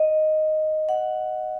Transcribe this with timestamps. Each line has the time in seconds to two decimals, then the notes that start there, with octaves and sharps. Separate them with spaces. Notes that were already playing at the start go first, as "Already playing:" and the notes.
Already playing: D#5
0.89 F#5